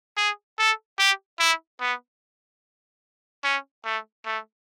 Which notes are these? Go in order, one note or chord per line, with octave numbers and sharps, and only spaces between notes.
G#4
A4
G4
E4
B3
C#4
A3
A3